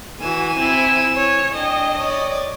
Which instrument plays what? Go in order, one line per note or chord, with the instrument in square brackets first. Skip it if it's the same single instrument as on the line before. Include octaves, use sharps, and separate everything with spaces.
[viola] E3 F#4 [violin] G#5 E7
[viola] C4 E4
C#5
[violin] D4 G5 [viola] D#5
[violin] C#5 D5